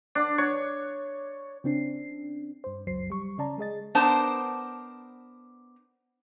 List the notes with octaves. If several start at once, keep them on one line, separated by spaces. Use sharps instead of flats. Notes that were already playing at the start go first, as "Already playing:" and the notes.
D4
C#5
C#3 C4 D4 C7
G2 C5
G1 C#2 F#2 F#3 C5 C7
G3 C#6
C#3 C#4 D5 A5 A#5
G#3 G#4 D#5 A6
B3 D4 A#4 C5 A5